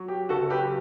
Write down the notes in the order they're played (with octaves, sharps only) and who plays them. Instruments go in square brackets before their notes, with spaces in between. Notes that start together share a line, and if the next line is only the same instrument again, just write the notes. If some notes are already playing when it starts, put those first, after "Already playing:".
Already playing: [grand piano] F#3
G4
F#1 F#4 A4
G4 B4